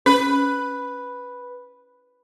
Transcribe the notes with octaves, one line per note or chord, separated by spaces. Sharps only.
C#4 B4